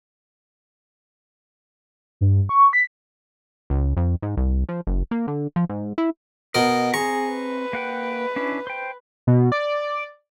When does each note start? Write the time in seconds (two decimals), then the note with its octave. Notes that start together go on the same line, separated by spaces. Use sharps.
2.21 G2
2.49 C#6
2.73 B6
3.70 C#2
3.97 F2
4.22 G#2
4.37 C2
4.69 F3
4.87 F#1
5.11 A#3
5.28 D3
5.56 F3
5.69 G#2
5.98 E4
6.55 B2 A#4 D#5
6.94 C4 G#4 A#5 C#6
7.29 B4
7.73 A#3 F#5 G5
8.36 C#4 D4 E4
8.67 C5 G5
9.27 B2
9.52 D5